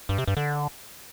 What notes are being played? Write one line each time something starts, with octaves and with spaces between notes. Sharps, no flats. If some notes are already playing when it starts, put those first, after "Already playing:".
G2
C3
G2
D3